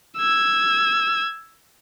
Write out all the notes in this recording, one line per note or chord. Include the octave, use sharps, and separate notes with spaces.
E6 G#6